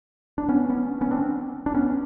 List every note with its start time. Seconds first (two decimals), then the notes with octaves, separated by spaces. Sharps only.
0.38 D4
0.49 B3 C#4
0.69 B3 C#4
1.01 B3 C#4
1.11 C4 D4
1.66 D4
1.74 B3 C#4